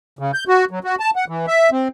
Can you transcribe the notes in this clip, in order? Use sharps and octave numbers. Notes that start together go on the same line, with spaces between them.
C#3
G6
F#4
F#3
F#4
A5
F#5
E3
E5
C4